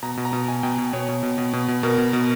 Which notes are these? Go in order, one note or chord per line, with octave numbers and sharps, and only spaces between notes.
B2 A#5
B2
A#5
B2
B2 G#5
B2 G5
B2
B2 C#5
B2
B2
B2
B2
B2
B2 A#4
B2
B2